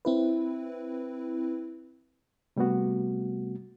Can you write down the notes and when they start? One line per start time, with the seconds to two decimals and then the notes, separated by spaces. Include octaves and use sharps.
0.05 C4 E4 B4
2.56 C3 G3 A3 B3 F#4